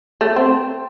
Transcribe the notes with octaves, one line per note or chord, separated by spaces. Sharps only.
A3
C4